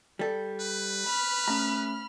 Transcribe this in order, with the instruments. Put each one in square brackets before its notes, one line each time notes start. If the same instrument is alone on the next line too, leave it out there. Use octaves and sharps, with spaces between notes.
[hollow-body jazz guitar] G3 A4
[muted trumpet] B4
[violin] B5 F6
[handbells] A3 C#4 [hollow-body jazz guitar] A#5